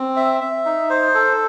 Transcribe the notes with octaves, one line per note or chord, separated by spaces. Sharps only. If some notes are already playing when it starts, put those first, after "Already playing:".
Already playing: C4
E5
E5
D#4
C5
A4